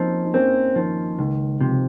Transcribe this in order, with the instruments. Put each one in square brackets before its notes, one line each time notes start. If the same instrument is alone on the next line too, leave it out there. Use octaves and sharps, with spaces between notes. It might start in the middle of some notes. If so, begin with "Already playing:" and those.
Already playing: [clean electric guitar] F3 [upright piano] A#3 C4 C#4 D#4
[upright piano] D#4
[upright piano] A#3 C#4 [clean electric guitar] C4
[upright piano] D#3 [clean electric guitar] F3
[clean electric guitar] C#2 [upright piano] D#3
[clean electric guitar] C3 [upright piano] F3